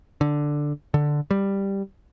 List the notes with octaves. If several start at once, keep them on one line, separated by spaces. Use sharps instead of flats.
D3
D3
G3